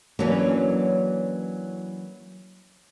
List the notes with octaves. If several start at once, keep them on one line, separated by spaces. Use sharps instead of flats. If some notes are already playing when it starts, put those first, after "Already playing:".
E3 F#3 A#3 C#4 D4